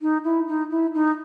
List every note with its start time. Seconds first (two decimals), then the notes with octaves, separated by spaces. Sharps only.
0.02 D#4
0.24 E4
0.47 D#4
0.71 E4
0.94 D#4